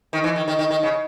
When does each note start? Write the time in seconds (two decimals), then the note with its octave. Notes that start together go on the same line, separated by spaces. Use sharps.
0.13 D#3
0.24 E3
0.36 D#3
0.48 D#3
0.59 D#3
0.71 D#3
0.83 C#3